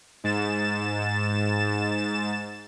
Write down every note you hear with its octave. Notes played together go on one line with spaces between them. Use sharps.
G#2 A6 E7